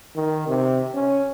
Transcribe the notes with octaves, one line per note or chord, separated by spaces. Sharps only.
D#3
C3
C#4